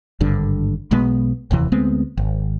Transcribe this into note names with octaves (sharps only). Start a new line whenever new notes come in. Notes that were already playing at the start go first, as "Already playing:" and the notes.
G#1 G2 D3
B1 B2 G#3 B3
F1 D#2 C3 E3
D2 G#3 B3 C4
G#1